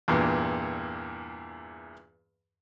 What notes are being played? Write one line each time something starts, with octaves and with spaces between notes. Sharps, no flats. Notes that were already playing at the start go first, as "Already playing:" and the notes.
E2 G2 A#2